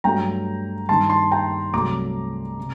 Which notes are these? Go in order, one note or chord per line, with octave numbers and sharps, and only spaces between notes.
G2 F#3 A3 G5 A#5
G2 D#3 G3 A5 C6
A5 C6
G5 A#5
C2 C3 F#3 A3 A#5 D6
C3